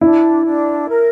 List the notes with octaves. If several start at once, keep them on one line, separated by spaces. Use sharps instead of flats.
D4 E4
D4
A#4